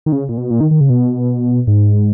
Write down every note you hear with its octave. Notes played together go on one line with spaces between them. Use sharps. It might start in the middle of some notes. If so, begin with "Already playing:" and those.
D#3
C#3
A#2
B2
A#2
D#3
D#3
C#3
B2
G#2